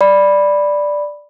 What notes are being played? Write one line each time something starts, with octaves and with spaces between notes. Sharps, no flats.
D5 B5